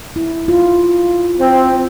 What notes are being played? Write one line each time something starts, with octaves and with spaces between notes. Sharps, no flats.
E4
F4
C4